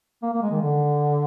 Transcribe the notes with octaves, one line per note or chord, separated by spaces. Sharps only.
A#3
A#3
G#3
D#3
D3